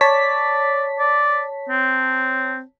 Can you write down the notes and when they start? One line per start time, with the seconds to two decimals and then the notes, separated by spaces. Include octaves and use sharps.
0.01 C#5 D5 A5 B6
0.99 D5
1.69 C4